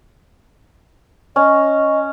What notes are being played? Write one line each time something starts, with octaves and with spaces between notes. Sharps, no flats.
C#4 D#5